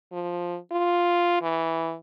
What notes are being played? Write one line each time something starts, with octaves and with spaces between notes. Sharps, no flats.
F3
F4
E3